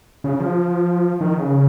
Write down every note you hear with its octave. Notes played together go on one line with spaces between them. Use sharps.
C#3
F3
D#3
C#3